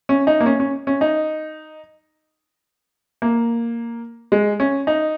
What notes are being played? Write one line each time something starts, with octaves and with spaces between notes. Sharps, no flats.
C#4
D#4
A#3
C#4
C#4
C#4
D#4
A#3
G#3
C#4
D#4